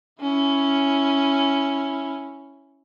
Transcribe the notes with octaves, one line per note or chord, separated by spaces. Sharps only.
C#4 E4